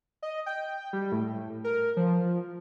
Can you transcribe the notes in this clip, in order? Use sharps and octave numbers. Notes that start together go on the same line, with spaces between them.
D#5
G5
G3
A2
A#4
F3